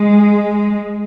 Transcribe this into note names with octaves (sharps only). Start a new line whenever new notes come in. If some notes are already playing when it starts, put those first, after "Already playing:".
Already playing: G#3